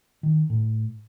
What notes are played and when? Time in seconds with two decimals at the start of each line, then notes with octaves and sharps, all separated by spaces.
0.23 D#3
0.50 A2